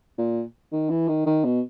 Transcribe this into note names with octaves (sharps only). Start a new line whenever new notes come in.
A#2
D#3
E3
D#3
D#3
B2